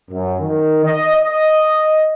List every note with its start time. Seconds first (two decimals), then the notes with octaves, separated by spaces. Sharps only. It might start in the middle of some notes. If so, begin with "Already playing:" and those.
0.11 F#2
0.40 D#3
0.85 D#5
1.17 D#5